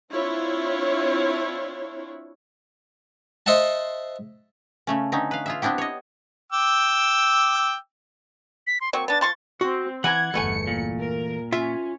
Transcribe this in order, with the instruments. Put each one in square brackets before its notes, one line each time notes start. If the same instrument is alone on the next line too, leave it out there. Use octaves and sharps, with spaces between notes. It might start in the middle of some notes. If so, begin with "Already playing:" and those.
[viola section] C4 D4 E4 F4 C#5
[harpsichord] C5 D#5 E5 F#5 A5
[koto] C#3 A3 C#4
D3 C4 C#4 D#4
B4 F5
F4 G#4 E5
B3 C4 D4 E4 G4
C#5 D#5
[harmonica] G5 D6 E6
[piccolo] B6
C6
[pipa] F#3 A#3 C4 [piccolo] C#6
[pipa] B3 D4 [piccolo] A6
[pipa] F3 C6 C#6 [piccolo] A6
[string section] C4 [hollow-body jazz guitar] F#4
[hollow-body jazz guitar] E3 G#5 A#5 [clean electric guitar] F#5 [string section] G#6
[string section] G1 E2 C#7 [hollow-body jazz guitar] E3 A3 G#5
[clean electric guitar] A#2
[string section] A#4
[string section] C#4 [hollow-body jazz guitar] F4 E5